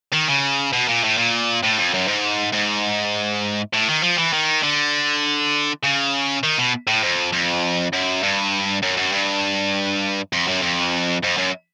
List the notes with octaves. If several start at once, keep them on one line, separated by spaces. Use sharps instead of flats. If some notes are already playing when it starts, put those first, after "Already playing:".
D#3
C#3
B2
A#2
A2
A#2
A2
F2
F#2
G#2
G#2
A2
D#3
F3
E3
D#3
D3
C#3
D#3
B2
A2
F2
F2
F#2
G2
F#2
F#2
G2
F2
F#2
F2
F2
F#2